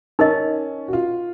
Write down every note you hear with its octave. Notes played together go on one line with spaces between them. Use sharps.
C#4 D#4 A#4 D#5
F#4
F4